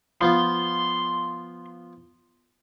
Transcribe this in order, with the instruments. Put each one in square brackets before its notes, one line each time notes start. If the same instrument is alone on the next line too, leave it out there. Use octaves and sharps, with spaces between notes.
[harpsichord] F3 B3 F4 [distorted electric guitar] C6